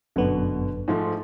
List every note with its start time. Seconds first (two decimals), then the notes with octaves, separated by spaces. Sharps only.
0.16 G1 F#2 B2 D3 B3
0.88 G#2 F3 A3